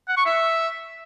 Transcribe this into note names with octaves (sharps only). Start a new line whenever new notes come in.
F#5
C#6
E5